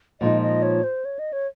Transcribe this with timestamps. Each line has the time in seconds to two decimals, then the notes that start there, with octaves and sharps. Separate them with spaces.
0.21 A#2 F3 G#3 D#4 D#5
0.42 D#5
0.63 C#5
0.84 C5
1.05 C#5
1.19 D#5
1.33 C#5